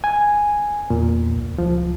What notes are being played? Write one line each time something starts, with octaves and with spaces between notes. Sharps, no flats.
G#5
E2 A#2
C#2
F3